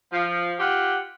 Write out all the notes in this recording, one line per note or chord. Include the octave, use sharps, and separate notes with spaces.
F3
F4 G4 F#5